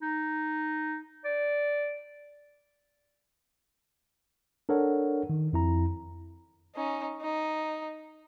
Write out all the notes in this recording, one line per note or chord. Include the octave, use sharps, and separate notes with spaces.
D#4
D5
D4 A4 A#4 C#5 F#5
D#3
F2 E4 A#5
C#4 D#4
D#4